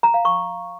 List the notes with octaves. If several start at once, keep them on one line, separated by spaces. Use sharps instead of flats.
A#5
F5
C#6